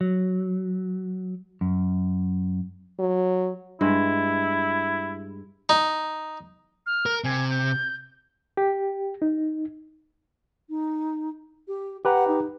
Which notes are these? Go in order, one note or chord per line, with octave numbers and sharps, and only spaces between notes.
F#3
F#2
F#3
G2 G#3 E4
D#4
F6
A#4
C3 G#5
G6
G4
D#4
D#4
G4
G4 B4 F#5 A#5
D#4